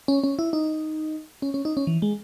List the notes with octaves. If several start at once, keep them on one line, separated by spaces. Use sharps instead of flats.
C#4
C#4
E4
D#4
C#4
C#4
D#4
C#4
E3
G#3